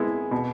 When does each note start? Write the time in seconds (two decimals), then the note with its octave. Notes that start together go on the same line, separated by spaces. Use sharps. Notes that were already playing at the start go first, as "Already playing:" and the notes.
Already playing: G#3 B3 E4 G#4
0.31 B2